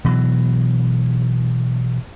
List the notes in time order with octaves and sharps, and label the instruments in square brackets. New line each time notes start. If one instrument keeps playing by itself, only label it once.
[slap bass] B2 E3 F#3